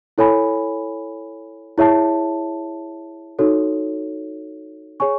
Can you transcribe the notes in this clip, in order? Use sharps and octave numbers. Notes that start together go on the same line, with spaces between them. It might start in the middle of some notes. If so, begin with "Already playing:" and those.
E4 A4 C#5 G#5 B5
E4 G#4 C#5 E5 A5
D#4 F#4 A4 C#5
G#4 C#5 G#5 C#6